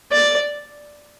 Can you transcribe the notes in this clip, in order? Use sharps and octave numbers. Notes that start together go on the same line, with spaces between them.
D5